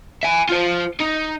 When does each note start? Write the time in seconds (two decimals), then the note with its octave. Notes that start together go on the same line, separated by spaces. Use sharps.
0.23 E5 G#5
0.49 F4 C5
1.00 D#4